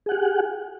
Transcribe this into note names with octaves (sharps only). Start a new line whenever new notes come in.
G4 G#4 F#5